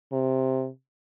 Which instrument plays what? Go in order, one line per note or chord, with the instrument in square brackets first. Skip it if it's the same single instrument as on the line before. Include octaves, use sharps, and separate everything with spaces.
[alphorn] C3